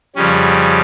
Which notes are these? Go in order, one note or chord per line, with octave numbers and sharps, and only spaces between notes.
F2 C#3 G3 C#4